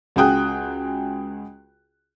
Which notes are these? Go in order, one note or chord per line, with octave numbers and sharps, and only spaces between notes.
C#2 F#4 G#4 G5 D#6 F#6